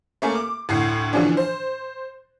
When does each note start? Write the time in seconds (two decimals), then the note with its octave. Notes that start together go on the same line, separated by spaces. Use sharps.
0.22 A3 A#3 C#4
0.35 D6
0.69 D2 A2 F#5 C7
1.13 D3 E3 F3 C#4 D4
1.37 C5